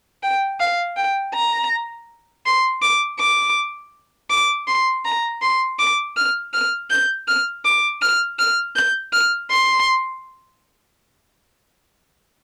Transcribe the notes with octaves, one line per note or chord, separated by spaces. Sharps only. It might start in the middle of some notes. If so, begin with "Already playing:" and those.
G5
F5
G5
A#5
C6
D6
D6
D6
C6
A#5
C6
D6
F6
F6
G6
F6
D6
F6
F6
G6
F6
C6